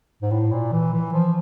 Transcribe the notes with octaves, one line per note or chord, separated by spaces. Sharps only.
G#2
A2
A#2
E3
E3
F3